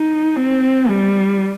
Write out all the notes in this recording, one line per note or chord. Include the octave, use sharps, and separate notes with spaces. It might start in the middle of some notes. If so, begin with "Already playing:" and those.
Already playing: D#4
C4
G3